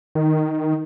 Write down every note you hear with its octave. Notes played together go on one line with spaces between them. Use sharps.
D#3